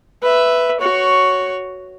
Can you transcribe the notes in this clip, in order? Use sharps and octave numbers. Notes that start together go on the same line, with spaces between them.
B4 E5
F#4 C#5